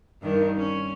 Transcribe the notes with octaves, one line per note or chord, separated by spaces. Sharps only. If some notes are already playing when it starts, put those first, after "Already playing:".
G2 D#3 A#4
C#4